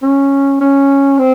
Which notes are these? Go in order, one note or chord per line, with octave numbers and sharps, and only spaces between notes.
C#4
C#4
C4